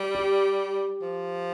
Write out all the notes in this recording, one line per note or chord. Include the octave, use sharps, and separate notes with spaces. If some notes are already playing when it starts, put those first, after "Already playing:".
Already playing: G3
G4
F3